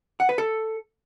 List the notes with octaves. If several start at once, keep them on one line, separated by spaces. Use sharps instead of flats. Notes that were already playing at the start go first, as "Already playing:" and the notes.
F#5
B4
A4